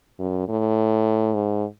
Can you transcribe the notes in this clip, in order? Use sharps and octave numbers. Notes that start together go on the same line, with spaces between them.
F#2
A2
G#2